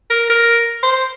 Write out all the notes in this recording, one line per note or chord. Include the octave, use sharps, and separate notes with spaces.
A#4
A#4
C5